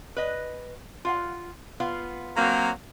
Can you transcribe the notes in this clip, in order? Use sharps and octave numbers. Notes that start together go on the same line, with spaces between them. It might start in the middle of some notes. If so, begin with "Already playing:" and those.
B4 D#5
F4 F5 F#5
B3 F4 F5
F#3 A#3 C4